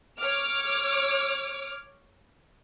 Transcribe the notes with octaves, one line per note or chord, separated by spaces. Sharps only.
C#5 D6 F6